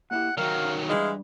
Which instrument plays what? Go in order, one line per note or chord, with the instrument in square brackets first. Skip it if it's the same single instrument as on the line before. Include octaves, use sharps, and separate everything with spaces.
[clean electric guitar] A#2 E4 G4 [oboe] F#5
[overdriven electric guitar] D#3 F#3 [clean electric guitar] F#4 A#4 [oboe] F5
[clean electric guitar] G2 [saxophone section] E3 G#3 [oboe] F5